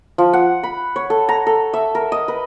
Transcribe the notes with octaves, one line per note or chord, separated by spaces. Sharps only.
F3
F#5
B5
C#5
A4
A#5
A4
E5
A#4
D#5
B4